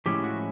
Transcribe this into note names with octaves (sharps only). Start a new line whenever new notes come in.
A2 F3 G#3 C#4 E4 G4
F#4